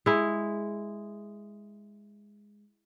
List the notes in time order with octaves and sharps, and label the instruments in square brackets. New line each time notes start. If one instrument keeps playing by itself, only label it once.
[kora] G#3 E4